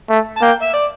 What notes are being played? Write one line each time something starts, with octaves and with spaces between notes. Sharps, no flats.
A3
A5
A#3 G5
E5
D5